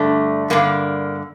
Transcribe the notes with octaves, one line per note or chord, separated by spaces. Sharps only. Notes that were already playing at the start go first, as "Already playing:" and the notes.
Already playing: G2 D3 A3
G2 D3 A#3